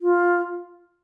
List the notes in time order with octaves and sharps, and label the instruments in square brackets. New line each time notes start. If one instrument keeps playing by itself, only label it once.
[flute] F4